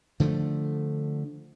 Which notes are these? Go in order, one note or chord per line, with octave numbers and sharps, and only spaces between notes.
D3 F3 G3 A3